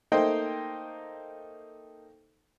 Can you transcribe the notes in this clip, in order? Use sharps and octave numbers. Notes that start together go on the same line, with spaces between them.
A3 A#3 D#4 C5 D#5 G5